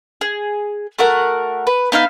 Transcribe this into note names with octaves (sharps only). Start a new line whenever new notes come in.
G#4
A3 F#4 A#4 F#5
B4
B3 D#4 E4 F5